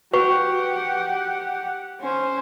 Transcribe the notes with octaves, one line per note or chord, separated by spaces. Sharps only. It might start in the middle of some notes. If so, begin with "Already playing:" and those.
F#4 G4 B4 F#5 C#6
C#4 C5